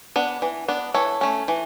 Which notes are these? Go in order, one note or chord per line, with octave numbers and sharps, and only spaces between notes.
B3 D4
E3
B3 D4
E3 A4 C#5
A3 C#4
E3